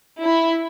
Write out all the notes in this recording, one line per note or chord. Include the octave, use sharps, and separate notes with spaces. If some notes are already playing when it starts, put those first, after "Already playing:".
E4